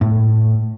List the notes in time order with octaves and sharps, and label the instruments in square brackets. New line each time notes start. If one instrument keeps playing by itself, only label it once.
[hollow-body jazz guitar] A2